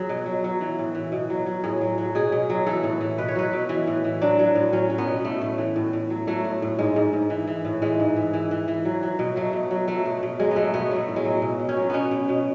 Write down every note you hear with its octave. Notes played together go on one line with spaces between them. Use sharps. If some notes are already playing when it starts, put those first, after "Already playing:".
Already playing: F#3 G#4
B2
F#3
F#3
E3
A2
E3
B2
F#3
F#3
A2 G#4
F#3
F#3
B2 G#4
B2
F#3
E3 A4
A2
E3
B2 B4
C#5
F#3 B4
B2
E3
A2
E3
F#3 D4
F#3
A2
F#3 C#4
F#3
B3
B2
A2 A3
A2
E3
A2
A2
F#3
F#3 A3
A2
A2
G#2 G#3
G#2
G#2
E3
E3
A2
E3 G#3
G#2
E3
E3
E3
E3
F#3
F#3
B2
F#3 A3
B2
F#3
F#3 A3
B2
B2
F#3 G#3
F#3 A3 B3
B2 B3
F#3 A3
A2
G#3
F#3
B2
B2
C#4
F#3
B2 B3 C#4
B2
B2